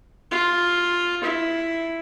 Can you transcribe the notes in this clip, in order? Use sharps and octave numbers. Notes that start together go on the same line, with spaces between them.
F4
E4